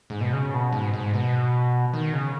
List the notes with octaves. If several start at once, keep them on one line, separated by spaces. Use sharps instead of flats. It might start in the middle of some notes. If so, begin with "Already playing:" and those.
G#2
B2
C#3
B2
G#2
G#2
B2
D#3
C#3